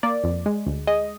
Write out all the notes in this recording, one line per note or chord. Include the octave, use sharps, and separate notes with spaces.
A#3 D5
F2
G#3
D2
G#3 D#5